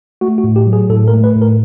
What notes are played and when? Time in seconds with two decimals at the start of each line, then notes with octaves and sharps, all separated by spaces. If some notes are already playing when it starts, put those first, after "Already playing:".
0.21 A3 F#4
0.38 F#4
0.44 A2
0.56 G4
0.67 F#3
0.73 G#4
0.89 A2 A4
1.08 A#4
1.13 A3
1.24 B4
1.36 A2
1.42 A#4